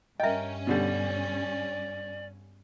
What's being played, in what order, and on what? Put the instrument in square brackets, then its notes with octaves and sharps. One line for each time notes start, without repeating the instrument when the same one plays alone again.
[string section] G2 C#4 [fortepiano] A#4 G5 [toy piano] D#5 E5
[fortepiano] B2 D3 G3 [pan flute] D5